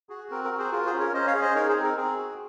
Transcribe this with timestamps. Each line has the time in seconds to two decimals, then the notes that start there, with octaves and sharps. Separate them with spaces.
0.09 F#4 G#4
0.31 C4 A#4
0.44 A#4
0.52 F#4
0.58 G#4 C5
0.72 F4 A#4
0.86 G#4 C5
0.93 C#4
1.00 A#4 C#5
1.13 C#4 C5 D#5
1.27 C#5 F5
1.35 G#4
1.42 C5 D#5
1.55 D#4 A#4 C#5
1.69 G#4 C5
1.76 C4
1.83 A#4
1.97 C4 G#4
2.18 F#4